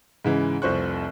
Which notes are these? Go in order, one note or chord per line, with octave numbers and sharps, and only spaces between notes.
G#2 C#3 E3
F1 C2 F3 C5 C#6 F#6